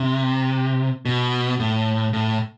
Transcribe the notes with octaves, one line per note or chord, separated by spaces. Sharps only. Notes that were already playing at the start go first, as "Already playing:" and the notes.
Already playing: C3
B2
A2
A2